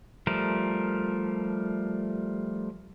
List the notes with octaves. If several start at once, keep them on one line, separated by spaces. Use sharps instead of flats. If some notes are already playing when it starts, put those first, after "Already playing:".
F3 G3 A3 A#4